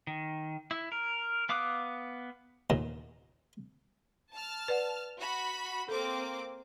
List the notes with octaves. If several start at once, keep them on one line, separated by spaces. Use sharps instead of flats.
D#3
E4
A#4
B3 F5 D6 D#6 F#6
D#2 A#2
A5 F6
B4 D5 F#5
F#4 B5
A#3 C4 A4 D6